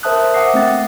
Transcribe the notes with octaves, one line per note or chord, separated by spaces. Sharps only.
A#4 C5 E5 A5 D#6 F#6
E5 F#5 D6 D#6 A#6 C7
A3 C4 A6